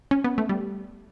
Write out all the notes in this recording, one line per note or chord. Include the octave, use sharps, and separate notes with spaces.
C#4
B3
A3
G3